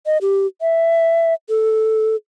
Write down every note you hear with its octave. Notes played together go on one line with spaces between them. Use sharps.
D#5
G4
E5
A4